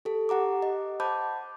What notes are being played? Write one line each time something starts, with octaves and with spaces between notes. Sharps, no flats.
G4 A4
G4 F#5 A#5 D6
D#5
C5 F#5 A5 B5 D6 G6